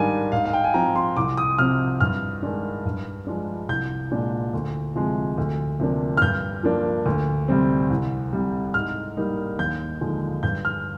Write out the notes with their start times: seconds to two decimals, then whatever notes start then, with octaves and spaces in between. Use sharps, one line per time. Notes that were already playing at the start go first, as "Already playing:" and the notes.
Already playing: G#2 D#3 G3 D4 F5 G#5
0.32 G#2 F5
0.45 F5
0.53 G5
0.64 G#5
0.74 F3 C4 A#5
0.96 C6
1.16 C2 D6
1.37 D#6
1.58 C3 F3 C4 F6
2.00 G2 F6
2.43 D#3 G#3 D4
2.85 G2
3.27 F3 G#3 D4
3.68 C2 G6
4.11 A#2 G#3 D4
4.54 D2
4.95 C3 F3 G#3
5.38 D2
5.80 C3 F3 A#3 D4
6.17 F6
6.22 G2 G6
6.63 F3 A#3 D4
7.06 D2
7.48 C3 G3 C4
7.90 C2
8.33 C3 G3
8.74 G#2 F6
9.17 G3 A#3 D#4
9.58 D#2 G6
10.01 D3 F3 G#3 D#4
10.43 G2 G6
10.65 F6